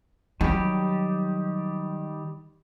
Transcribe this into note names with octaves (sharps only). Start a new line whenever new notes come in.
D#3 F#3 G3 G4